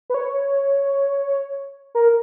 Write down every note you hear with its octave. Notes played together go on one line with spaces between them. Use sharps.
B4
C#5
A#4